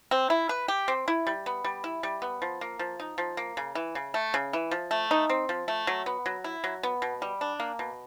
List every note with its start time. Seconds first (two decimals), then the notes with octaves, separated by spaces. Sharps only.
0.11 C4
0.30 E4
0.49 B4
0.68 G4
0.88 C4
1.08 E4
1.27 G3
1.46 B3
1.64 G3
1.84 E4
2.03 G3
2.22 B3
2.42 F3
2.61 A#3
2.79 F3
3.00 D#4
3.18 F3
3.37 A#3
3.57 C#3
3.75 E3
3.95 C#3
4.14 A3
4.34 C#3
4.53 E3
4.71 F3
4.91 A3
5.11 D#4
5.29 C4
5.49 F3
5.68 A3
5.87 F#3
6.06 B3
6.26 F#3
6.44 E4
6.64 F#3
6.83 B3
7.02 B2
7.22 G3
7.41 D4
7.60 A#3
7.79 B2